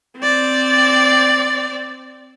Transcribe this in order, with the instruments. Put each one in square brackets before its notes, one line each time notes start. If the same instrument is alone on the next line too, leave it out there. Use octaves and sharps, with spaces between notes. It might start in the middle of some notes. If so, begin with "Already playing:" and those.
[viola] C4 D5